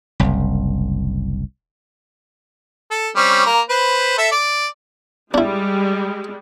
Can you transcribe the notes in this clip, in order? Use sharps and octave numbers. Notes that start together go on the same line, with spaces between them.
F#1 C2
A4
G3 C4 C#4
A#3 A#5
B4 C5
A4 E5
D5
G3 G#3 D4 E4